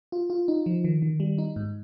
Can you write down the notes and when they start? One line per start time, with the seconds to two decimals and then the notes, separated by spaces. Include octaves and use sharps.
0.12 F4
0.30 F4
0.48 D#4
0.66 F3
0.84 D#3
1.02 D#3
1.20 G3
1.38 D#4
1.56 G#2